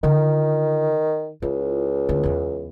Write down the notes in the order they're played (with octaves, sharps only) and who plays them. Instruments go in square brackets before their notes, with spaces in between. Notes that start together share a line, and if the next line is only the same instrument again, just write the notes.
[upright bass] D3 F4 [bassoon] D#3
[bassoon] C#2 [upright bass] E4 F4
[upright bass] D2 D4
E2 B3